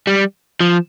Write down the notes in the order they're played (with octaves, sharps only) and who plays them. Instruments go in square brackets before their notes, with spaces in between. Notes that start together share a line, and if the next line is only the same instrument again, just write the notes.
[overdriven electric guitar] G3
F3